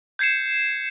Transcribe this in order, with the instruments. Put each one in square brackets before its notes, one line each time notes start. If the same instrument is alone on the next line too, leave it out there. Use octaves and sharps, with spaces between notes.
[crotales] G6 G#6 C7 C#7 E7